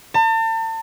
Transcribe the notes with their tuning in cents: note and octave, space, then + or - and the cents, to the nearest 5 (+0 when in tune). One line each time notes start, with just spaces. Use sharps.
A5 +40